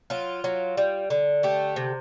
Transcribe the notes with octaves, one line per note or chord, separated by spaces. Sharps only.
F#3 F4
F#3
G3
D3
A3 G4
C3